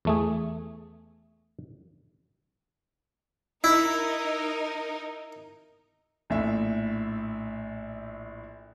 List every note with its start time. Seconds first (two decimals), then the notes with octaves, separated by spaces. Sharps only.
0.05 E2 A3 G#4
3.64 D#4 E4 A#4
6.30 A#1 A2 E5